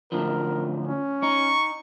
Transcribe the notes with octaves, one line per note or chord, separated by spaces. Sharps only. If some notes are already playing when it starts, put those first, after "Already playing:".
A2 D3 F3 A#4
C#4
D#4 C#6